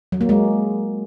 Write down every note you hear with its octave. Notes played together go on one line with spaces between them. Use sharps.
F#3
A#3
G#3